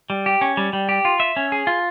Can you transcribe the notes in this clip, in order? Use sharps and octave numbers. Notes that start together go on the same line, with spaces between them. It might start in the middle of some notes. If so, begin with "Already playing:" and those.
G3
G4
C#4
G3
G3
G4
F4
E5
C#4
G#4
F4